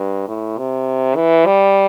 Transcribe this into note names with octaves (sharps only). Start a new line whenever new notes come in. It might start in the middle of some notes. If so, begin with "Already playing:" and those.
Already playing: G2
A2
C3
E3
G3